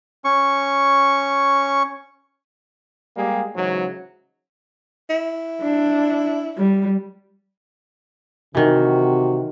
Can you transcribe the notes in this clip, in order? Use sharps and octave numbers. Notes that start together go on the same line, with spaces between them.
C#4 C#6
G3 G#3 A#3 G4 G#4
G#2 C#3 E3 F#3
E4
D4
G3
C3 D#3 E3 F#4